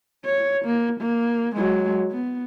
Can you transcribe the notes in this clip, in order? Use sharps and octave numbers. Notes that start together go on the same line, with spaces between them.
C#5
A#3
A#3
F#3 G#3
B3